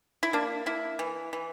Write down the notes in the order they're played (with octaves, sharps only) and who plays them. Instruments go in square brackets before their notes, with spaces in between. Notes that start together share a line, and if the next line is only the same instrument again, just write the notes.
[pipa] E4
A#3 D4
A#3 E4
E3
E3